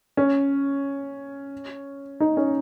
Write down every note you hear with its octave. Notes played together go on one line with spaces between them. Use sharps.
C#4
D#4
C#4